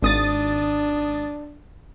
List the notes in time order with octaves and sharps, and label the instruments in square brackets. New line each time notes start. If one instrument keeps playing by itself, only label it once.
[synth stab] G#1 D#6 A6 [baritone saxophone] D4